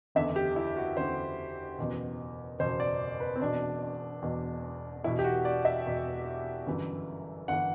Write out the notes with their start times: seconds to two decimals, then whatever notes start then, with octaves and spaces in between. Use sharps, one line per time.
0.15 F#1 E2 D3 E5
0.36 G4
0.56 E4
0.76 F#4
0.97 F#1 E2 D3 C5
1.78 F#1 E2 B2
2.59 F#1 E2 B2 C5
2.80 D5
3.20 B4
3.36 C4
3.41 E1 E2 B2 D4
4.22 E1 E2 B2
5.04 E1 E2 B2 E4
5.19 G4
5.24 F#4
5.45 D5
5.65 E5
5.86 E1 E2 B2
6.66 G1 F#2 E3
7.48 G1 E3 F#5